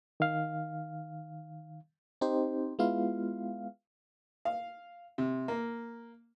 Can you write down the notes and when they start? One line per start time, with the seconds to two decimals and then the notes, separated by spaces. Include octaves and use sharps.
0.20 D#3 F5
2.21 C4 D#4 G4 C5
2.79 G#3 B3 E4 F4 F5
4.45 F5
5.18 C3
5.48 A#3